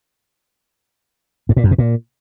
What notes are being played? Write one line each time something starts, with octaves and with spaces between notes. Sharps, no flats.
G2
A#2
F#2
B2
A#2